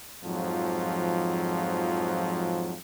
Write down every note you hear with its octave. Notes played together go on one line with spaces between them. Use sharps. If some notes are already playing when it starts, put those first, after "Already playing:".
F2 G#2 F3 F#3